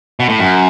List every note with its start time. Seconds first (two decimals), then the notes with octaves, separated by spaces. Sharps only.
0.20 B2
0.29 A2
0.39 F#2